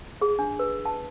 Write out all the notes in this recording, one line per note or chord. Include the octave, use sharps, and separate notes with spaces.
G#4
D4
B4
A5